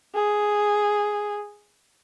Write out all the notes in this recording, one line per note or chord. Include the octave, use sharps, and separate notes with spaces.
G#4